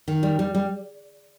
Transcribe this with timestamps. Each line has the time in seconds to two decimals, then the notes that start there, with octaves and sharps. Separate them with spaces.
0.08 D#3
0.23 G3
0.39 G3
0.55 G3